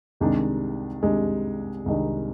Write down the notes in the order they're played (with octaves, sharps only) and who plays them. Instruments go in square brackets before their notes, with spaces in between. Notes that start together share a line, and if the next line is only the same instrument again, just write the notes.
[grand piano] C2 C3 D#3 G#3 D4
C2 C3 D#3 G#3 D4
C2 C3 D#3 G#3 D4